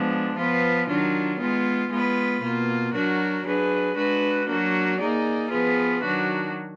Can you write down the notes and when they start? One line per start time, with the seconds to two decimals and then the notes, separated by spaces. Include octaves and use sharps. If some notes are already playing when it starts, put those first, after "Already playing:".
Already playing: F3 G#3 B3 D4
0.36 F3 B3 F4 B4
0.88 D#3 F#3 D4 F4
1.39 G#3 B3 F4
1.90 G#3 B3 F4 B4
2.42 B2 A#3 F4
2.93 F#3 D4 F#4 A#4
3.45 F#3 D4 G#4 B4
3.96 G#3 D4 F#4 B4
4.48 F#3 A#3 D4 F#4
4.99 A#3 D#4 G#4 D5
5.50 F3 B3 F4 G#4 B4
6.03 D#3 F#3 D4 F#4